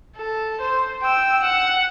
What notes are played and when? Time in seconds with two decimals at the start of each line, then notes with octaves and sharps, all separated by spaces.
0.17 A4
0.61 C5
1.03 G5 E6
1.42 F#5